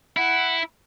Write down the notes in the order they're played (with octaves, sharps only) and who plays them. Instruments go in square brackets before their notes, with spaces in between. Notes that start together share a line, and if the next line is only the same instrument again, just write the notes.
[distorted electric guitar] E4 [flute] F#5